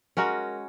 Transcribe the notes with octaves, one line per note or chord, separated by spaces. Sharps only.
G#3 C#4 F#4 A#4